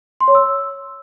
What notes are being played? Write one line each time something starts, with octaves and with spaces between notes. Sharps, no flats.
C6
C#5
E6